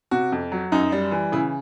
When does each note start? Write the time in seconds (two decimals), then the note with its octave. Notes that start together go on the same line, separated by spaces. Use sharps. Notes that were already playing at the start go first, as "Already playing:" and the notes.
0.11 C3 F#4
0.32 F2
0.52 F#3
0.72 F#2 D#4
0.92 G3
1.12 E3
1.32 C#3 E4